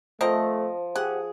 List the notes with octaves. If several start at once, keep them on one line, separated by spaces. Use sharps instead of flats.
F3 A3 C4 A#4 C5 D#5
G4 G#4 F#5